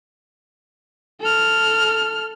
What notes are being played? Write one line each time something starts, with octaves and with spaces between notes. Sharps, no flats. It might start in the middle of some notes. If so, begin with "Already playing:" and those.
A4 F6